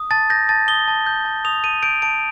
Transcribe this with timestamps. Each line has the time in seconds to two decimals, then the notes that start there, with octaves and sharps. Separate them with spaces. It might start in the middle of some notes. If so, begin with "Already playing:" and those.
Already playing: D#6
0.11 A5 A6
0.30 G6 A#6
0.49 A5 A6
0.68 D#6 G7
0.88 A5
1.06 G6
1.25 A5
1.45 D#6 F7
1.64 A5 D#7
1.83 G6 D7
2.02 A5 D7